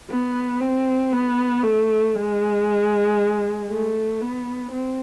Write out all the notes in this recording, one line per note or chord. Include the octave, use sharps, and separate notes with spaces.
B3
C4
B3
A3
G#3
A3
B3
C4